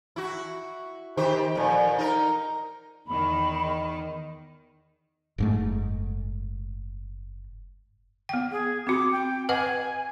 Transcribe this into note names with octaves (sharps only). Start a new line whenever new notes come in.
E4 F#4
D#3 G4 C5
F2 A#2
D#4 A#4
E2 D#3 B5
F#1 G#2 A3
B3 G5
G#4
C4 F#4 D6
G5
B4 D#5 F#5 G#5